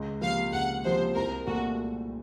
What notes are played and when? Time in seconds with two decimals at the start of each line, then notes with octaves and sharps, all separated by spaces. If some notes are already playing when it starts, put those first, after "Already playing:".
Already playing: C#2
0.21 C3 F3 A#3 F5
0.52 C#2 F#5
0.84 C3 F3 A#3 C5
1.15 C2 A#4
1.47 A#2 A3 F#4